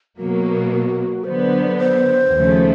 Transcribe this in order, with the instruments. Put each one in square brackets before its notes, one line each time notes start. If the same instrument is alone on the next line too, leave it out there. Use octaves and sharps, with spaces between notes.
[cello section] B2 F#3 A#3 [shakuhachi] F#4
[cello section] D3 F#3 B3 [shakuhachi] C5
[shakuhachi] C5
[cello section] D#2 C#3 F3 A3